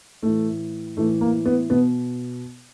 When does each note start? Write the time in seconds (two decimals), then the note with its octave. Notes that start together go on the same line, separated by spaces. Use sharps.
0.23 A2 E3 A3
0.97 A2 E3 A3
1.21 A#3
1.46 B3
1.70 B2 B3